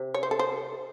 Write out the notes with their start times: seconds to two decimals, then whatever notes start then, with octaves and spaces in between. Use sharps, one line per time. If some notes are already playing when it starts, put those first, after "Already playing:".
Already playing: C3
0.14 C#5
0.23 C5
0.31 A4
0.39 C5